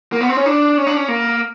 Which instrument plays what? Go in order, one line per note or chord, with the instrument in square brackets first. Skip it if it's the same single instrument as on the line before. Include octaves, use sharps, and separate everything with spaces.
[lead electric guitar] A#3
B3
C4
C#4
D4
C#4
D4
C#4
A#3